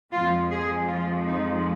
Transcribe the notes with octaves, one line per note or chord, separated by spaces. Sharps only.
F2 F3 G#3 F4
G#4
F4
D#4